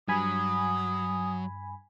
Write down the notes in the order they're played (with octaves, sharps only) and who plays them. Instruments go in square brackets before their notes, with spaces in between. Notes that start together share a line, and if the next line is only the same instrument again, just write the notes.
[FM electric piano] G2 G#5 B5 [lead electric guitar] F#3 [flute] D#6